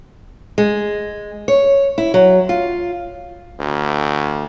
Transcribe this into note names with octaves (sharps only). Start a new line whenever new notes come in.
G#3
C#5
E4
F#3
F4
D2